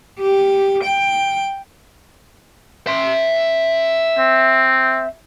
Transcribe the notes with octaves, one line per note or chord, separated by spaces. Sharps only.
G4
G5
E5 C6
C4